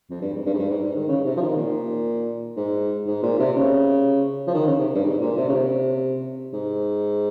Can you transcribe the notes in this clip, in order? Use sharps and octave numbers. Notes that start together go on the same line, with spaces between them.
F2
G2
G#2
G2
G#2
G2
G#2
G#2
D#3
C#3
C3
F3
D#3
A#2
G#2
G#2
A#2
C3
C#3
F3
D#3
C#3
C3
G2
G#2
A#2
C3
C#3
C3
G#2